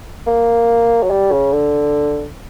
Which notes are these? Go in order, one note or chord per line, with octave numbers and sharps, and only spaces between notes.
A#3
F#3
G3
C#3
D3